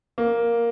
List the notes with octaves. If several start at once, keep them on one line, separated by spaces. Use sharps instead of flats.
A#3